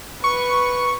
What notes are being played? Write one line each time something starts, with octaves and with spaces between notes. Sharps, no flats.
B4 C#6